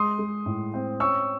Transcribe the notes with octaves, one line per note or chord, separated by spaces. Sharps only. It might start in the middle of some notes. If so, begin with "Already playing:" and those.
Already playing: G#3 C6 D#6
G#3
A2
C4
C#4 C#6 E6